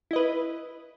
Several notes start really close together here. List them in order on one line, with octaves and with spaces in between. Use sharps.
E4 D#5 B4